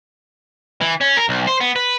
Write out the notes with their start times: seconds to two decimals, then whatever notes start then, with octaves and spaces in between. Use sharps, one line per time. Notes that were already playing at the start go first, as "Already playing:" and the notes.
0.81 E3
1.01 C#4
1.17 A#4
1.29 B1
1.47 C5
1.61 B3
1.76 B4